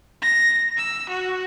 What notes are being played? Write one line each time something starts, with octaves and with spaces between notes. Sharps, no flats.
A#6
E6
F#4